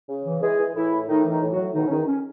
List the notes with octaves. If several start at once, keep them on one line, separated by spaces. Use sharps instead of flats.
C#3
E3
E3 G#3 G#4
E3
A2 E3 E4
A2
A2 D#3 D#4
E3
D#3 D#4
A2
A2 F#3 F#4
B2 D#3 D#4
C#4
E2 D#3 D#4
C#4